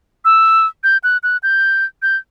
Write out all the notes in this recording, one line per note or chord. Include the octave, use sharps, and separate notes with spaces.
E6
G6
F#6
F#6
G6
G6